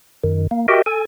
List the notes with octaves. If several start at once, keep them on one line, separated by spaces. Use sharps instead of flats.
F#2 D#3
A#3
F#4 G4 A#4 D#5 E5 G5
A4 G#5